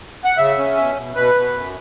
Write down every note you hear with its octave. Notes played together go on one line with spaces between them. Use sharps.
F#5
C#3 E5
C#4
B2
B2
B2 B4
B2
F#2